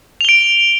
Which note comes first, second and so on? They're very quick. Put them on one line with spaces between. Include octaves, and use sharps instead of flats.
F7 G7 D7